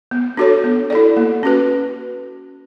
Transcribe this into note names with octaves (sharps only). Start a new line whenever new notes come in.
B3
D4 F#4 A4 C#5
B3
E4 A4 D5
A#3
C#4 F#4 B4